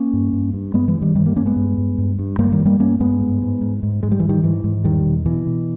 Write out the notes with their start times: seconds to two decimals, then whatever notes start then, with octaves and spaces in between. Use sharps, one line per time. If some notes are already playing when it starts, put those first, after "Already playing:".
Already playing: A#3 C#4
0.13 G2
0.33 G2
0.54 G2
0.74 G2 G#3 B3
0.88 E3 G#3
0.95 G2
1.02 D#3 G3
1.15 G2 D#3 G3
1.26 G3 A#3
1.36 G2 A#3 C#4
1.46 G#3 B3
1.56 G2
1.78 G2
1.98 G2
2.19 G2
2.38 G2 G3 A#3
2.52 D#3 G3
2.59 G2
2.66 G3 A#3
2.79 G2 A#3 C#4
3.00 G2 G#3 B3
3.21 G#2
3.42 G#2
3.61 G#2
3.83 G#2
4.03 G#2 G#3
4.11 G3
4.19 G#2 E3
4.29 D#3 G3
4.44 G#2 E3
4.64 G#2
4.84 E2 D#3 G3
5.05 B2
5.26 B2 E3
5.47 B2